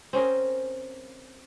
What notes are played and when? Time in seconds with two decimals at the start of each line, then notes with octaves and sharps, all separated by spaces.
0.13 C4 C#4 G#4 A#4